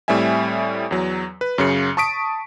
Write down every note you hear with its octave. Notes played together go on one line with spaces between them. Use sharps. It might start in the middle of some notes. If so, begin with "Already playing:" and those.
A2 G3 C4 E5 G#5
E2 F#3
B4
F#2 C#3 C#7
A5 C#6 D#6 B6 D7